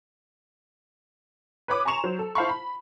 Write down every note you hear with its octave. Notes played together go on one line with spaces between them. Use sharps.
B4 C#5 B5 D6 D#6
G#5 A#5 C6 C#6 E7 F7
F#3 C5
A4
E4 C5 F5 A5 B5 C#6
B5